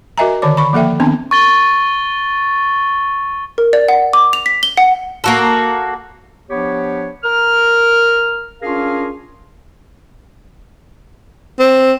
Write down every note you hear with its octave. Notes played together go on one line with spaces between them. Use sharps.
F#4 A#4 D#5 E5 G#5 A#5
D3 D#3 C#5 D5 D6
B5 C#6
F3 A#3 A4 E5 G5
D#3 B3 C4 D4 A5 C6
C#6 A6 G7
A#4
D5
F#5
D6
F7
B6
G7
F#5
A#3 F#4 A4
F3 B3 D4 G4 C#5
A#4 F6
C#4 D4 F4 G#4 A#4 F5
C4